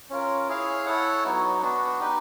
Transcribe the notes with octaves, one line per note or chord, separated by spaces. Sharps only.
C#4 F4 A#4
E4 G#4 C#5 F5
E4 A4 C#5 F#5
F#3 B3 D#4 F#4
B3 D4 F#4
D#4 G4 B4